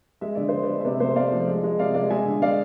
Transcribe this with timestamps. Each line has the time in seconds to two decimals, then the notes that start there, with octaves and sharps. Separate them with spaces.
0.21 G#3 E5
0.35 D3 D5
0.48 C5
0.54 D3
0.62 B4 D5
0.69 G#3
0.80 E5
0.84 C3 B4 D5
1.00 A3 C5 E5
1.16 A3 D5 F5
1.32 F3
1.47 G#3
1.64 G#3
1.79 C3 D5 F5
1.94 G#3 D5 F5
2.10 G#3 E5 G#5
2.25 D3
2.42 G#3 D5 F5